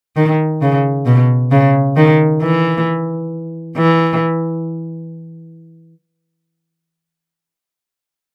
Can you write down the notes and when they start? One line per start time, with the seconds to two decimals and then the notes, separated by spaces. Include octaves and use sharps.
0.16 D#3
0.62 C#3
1.06 B2
1.51 C#3
1.97 D#3
2.42 E3
3.77 E3